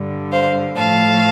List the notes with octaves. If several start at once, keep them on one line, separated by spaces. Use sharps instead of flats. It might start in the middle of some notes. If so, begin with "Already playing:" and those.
Already playing: G2 D3 G3
C5 F5
A2 F3 A3 F5 A5